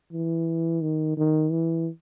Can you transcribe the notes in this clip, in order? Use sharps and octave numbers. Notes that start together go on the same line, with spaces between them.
E3
D#3
D#3
E3